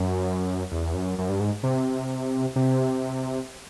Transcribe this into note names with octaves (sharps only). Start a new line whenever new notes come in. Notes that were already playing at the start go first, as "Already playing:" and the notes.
Already playing: F#2
E2
F#2
F#2
G2
G#2
C3
C3